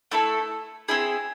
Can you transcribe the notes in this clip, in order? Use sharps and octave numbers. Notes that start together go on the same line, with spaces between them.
A3 E4 A4
C4 E4 G#4